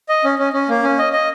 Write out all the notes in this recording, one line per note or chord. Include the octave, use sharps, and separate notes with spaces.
D#5
C#4
C#4
C#4
A#3
C#4
D#5
D#5